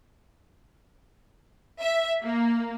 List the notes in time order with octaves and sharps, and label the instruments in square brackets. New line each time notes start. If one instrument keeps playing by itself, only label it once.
[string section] E5
A#3